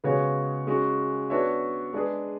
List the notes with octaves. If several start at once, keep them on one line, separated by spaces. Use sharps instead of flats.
C#3 G#3 B3 F#4 C#5
G#3 C#4 F#4
B3 D4 F#4 C#5 E5
G#3 D4 G#4 B4